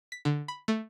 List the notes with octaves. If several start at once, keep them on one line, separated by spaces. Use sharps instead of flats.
B6
D3
B5
A3